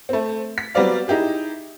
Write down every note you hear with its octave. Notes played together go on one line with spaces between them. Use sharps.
A3 C4
B6
F#3 G3 B3 C4 D5 F5
D#4 E4 G4 G#4